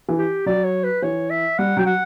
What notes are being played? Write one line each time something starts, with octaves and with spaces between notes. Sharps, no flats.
E3
G4
F#3 D5
C#5
B4
E3 C#5
E5
G3 F#5
F#3 G5
F#5